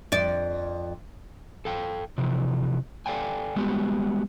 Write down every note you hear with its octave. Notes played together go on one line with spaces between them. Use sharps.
F2 D5
A4 F5 G5
C3 E3 F3
A4 D5 F5 G5 G#5
G3 G#3 B3 F#4 G4